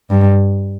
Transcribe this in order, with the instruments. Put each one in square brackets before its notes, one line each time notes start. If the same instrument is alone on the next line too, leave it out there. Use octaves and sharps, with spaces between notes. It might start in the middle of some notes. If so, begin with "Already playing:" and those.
[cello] G2